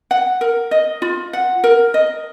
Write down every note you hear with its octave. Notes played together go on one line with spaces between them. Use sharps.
F#5
A#4
D#5
F4
F#5
A#4
D#5